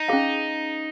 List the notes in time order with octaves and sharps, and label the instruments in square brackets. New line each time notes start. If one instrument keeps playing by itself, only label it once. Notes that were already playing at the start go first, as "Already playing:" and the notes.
Already playing: [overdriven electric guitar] D#4
[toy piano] C#4 G#4 F5